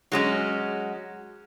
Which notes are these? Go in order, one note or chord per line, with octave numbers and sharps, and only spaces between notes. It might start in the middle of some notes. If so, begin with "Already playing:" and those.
F#3 G#3 C#4